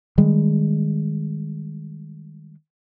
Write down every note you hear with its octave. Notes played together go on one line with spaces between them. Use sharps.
D#3 G3 G#3